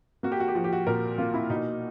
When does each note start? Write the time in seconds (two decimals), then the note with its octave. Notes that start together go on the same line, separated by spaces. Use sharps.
0.23 A#3 F#4
0.32 G4
0.40 F#4
0.48 G4
0.55 F3 F#4
0.64 G4
0.73 F#4
0.87 A#2 A#4
1.18 A#3 F4
1.34 E4
1.50 B2 D#4